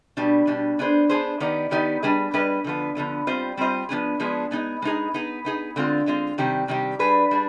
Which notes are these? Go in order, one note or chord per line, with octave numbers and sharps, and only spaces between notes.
B2 G3 D4
B2 G3 D4
B3 D4 G#4 C5
B3 D4 G#4 C5
D#3 B3 D#4 G4 D5
D#3 B3 D#4 G4 D5
G3 D4 G#4 B4 D#5
G3 D4 G#4 B4 D#5
D3 F3 B3
D3 F3 B3
G3 C4 F4 C5 D#5
G3 C4 F4 C5 D#5
F3 G#3 B3 D4 G#4
F3 G#3 B3 D4 G#4
G#3 B3 D#4 G#4
G#3 B3 D#4 G#4
B3 D#4 G#4
B3 D#4 G#4
D3 G#3 C4 F4
D3 G#3 C4 F4
C3 D#3 G3 C4 G4
C3 D#3 G3 C4 G4
G3 D4 G#4 B4
G3 D4 G#4